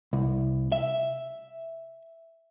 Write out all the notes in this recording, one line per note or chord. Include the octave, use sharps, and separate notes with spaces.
C2
E5